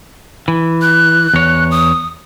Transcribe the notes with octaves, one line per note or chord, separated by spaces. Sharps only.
E3
F#6
E2 C#5
D#6